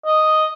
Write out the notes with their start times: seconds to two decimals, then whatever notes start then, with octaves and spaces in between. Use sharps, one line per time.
0.05 D#5